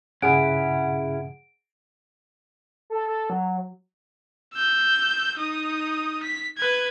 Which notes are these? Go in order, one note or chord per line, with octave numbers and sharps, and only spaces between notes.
G2 A#2 C#3 C#4 E4 G#4 F#5 D7
A4
A4
F#3
E6 G6
D#4 D#6
B6
B4 G#6